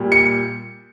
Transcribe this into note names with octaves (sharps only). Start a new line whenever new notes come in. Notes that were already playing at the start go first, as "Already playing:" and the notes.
Already playing: A#2 G3
C#7